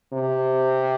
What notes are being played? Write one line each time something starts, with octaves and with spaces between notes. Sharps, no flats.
C3